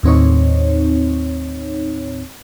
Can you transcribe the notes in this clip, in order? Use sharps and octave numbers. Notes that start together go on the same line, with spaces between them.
D#2 A2 C4 D#4 C#5